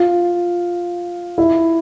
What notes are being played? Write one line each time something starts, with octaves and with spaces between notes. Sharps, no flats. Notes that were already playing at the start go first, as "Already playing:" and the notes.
Already playing: F4
E4